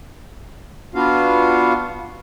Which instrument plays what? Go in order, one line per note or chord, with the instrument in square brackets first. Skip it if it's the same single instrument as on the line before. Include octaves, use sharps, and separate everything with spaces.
[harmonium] B3 D4 F4 F#4 F5